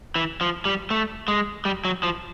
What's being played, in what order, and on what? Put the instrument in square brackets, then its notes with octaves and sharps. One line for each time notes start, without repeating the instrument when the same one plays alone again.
[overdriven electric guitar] E3
F3
G3
A3
G#3
G3
F#3
F3